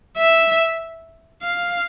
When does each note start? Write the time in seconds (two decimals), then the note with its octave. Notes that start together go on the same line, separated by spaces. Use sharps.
0.18 E5
1.43 F5